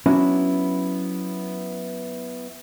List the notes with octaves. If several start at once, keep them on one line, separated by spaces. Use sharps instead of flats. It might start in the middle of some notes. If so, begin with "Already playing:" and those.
F#3 B3 C#4 D4 E4 F#4